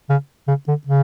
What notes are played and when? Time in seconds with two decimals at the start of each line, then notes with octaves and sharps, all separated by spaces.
0.10 C#3
0.48 C#3
0.68 D3
0.87 C#3